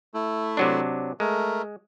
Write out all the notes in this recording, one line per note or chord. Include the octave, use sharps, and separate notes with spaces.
A3 E4
C3 F#3 D4
G#3 A3 A#4